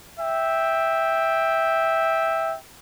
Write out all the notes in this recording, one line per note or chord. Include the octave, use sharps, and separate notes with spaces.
E5 G5